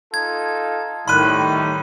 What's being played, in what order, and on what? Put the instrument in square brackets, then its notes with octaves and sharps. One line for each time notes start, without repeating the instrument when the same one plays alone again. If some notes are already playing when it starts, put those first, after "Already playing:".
[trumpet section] D#4 F4 A4 [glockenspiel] G#6
[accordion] A2 D#3 [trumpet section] G3 D#4 [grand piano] B5 F#6 [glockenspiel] C6 D#7